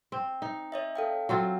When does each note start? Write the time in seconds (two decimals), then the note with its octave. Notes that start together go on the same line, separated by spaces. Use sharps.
0.12 C4
0.42 D#4
0.72 C#5 D#5 E5
0.96 A4 F5 G5
1.29 F#3 C4 F4